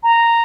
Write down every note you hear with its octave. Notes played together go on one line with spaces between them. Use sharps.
A#5